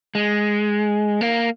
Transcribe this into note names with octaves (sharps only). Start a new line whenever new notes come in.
G#3
A#3